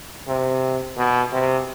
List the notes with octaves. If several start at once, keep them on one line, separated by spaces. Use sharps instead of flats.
C3
B2
C3